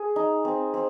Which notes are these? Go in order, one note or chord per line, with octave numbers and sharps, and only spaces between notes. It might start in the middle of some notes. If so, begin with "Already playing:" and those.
Already playing: G#4
D#4
C4
C4